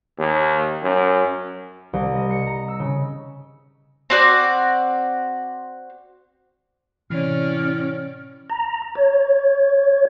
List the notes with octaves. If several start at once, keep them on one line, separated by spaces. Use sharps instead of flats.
D#2
F#2
C2
D#5
C#7
A#5
E6
C#3
C4 F#4 D5
A2 C3 E3 C#4 D5 F6
A#5
C#5